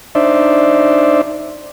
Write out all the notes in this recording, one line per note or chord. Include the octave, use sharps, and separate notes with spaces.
D4 D#4 C5 D5 E5